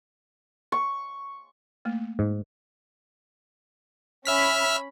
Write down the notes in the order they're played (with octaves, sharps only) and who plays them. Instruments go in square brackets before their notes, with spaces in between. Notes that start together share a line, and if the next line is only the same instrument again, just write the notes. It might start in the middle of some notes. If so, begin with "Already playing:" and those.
[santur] C#6
[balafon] A3 A#3
[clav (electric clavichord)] G#2
[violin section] C#4 B5 [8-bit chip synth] E5 F6 B6